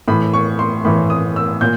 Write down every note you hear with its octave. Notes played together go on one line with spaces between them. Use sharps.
A2 E3 B5
C#6
C6
A2 E3 B5
D#6
E6
A#2 G6